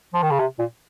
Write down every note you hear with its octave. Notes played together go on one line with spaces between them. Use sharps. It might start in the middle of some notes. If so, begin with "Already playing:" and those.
F3
D#3
C#3
C3
A#2